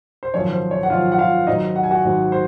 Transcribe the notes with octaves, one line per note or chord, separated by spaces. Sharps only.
C5
G#1 F#2 F3 C#5
C5
C#5
F#5
G#1 F#2 F3 F4 F5
F#5
F4 F5
G#1 G#2 F#3 D#4 D#5
F#5
G#5
F#4 F#5
G#1 G#2 F#3
C5